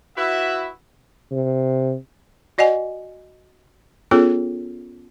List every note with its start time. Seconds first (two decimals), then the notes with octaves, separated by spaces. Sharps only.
0.17 E4 F#4 B4 E5
1.31 C3
2.58 F#4 D5 D#5 F#5 G#5
4.11 B3 C#4 F4 G#4 A4 C#5